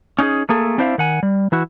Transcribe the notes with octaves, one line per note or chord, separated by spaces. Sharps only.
C#4 D#4 F#4 G#4
A3 A#3 G#4 A4
C4 D4 E4 C5 E5 F5
D#3 F#5 G#5
G3
E3 E4 F#4